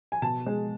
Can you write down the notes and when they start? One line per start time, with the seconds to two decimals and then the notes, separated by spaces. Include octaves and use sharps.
0.12 G#5
0.22 B2 A5
0.46 G#3